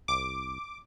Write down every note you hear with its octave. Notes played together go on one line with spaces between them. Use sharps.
C2 D6